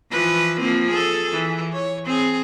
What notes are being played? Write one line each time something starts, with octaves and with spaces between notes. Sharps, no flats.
E3 F3 B4
F3 A#3 C4
G#4 A4
E3
C#5
C4 G#4